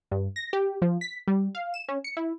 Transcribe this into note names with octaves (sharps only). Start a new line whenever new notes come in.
G2
A#6
G4
F3
B6
G3
F5
E7
C#4
C#7
E4